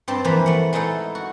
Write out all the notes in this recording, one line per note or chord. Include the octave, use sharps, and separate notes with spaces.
G2 C4 C5 A5
E3 F3 A#3 B4 C5
A3 F#5
G#3 A3 D#4 E4 A4
F#4